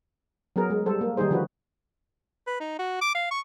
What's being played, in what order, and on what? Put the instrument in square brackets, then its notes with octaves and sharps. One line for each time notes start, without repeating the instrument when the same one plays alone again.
[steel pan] F#3 B3 G#4 A#4
G#3
G3 A4 C5
A#3
D#3 G3 A#3 D#4 G#4 C5
D3 F3 D4 F#4 B4
[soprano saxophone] B4
D#4
F#4
D6
F5
C#6